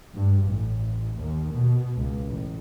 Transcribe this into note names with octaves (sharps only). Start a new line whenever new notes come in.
G2
A1
D#2
B2
C#2
A1